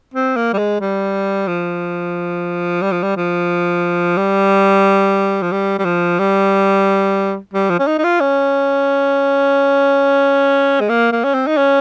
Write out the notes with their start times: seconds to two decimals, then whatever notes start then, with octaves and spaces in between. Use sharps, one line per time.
0.14 C4
0.36 A#3
0.53 G3
0.58 G#3
0.80 G3
1.48 F3
2.82 G3
2.92 F3
3.03 G3
3.17 F3
4.17 G3
5.42 F3
5.52 G3
5.79 G3
5.85 F3
6.19 G3
7.54 G3
7.70 F3
7.79 C#4
7.87 D#4
7.98 D#4
8.04 F4
8.21 C#4
10.80 G#3
10.89 A#3
11.12 A#3
11.24 C#4
11.34 C4
11.47 D#4
11.57 C#4